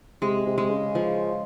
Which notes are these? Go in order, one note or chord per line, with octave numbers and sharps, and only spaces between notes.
C3 G#3
C3
G#3
C#3
F3